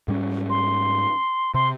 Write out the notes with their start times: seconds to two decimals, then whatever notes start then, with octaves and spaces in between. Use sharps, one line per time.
0.08 G#2 G3 C#4
0.50 C6
1.54 C3 C6